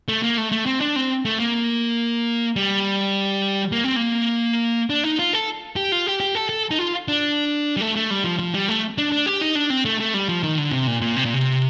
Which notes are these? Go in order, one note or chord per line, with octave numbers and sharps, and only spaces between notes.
A3
A#3
A3
A3
C4
D4
C4
A3
A#3
G3
A#3
C4
A#3
D4
D#4
F4
A4
G4
F4
G4
G4
A4
A4
D#4
F4
D4
G3
A3
A3
G3
F3
F3
G3
A3
D4
D4
G4
D#4
D4
C4
A3
A3
G3
F3
D#3
D3
C3
A#2
A#2
C3
A#2
C3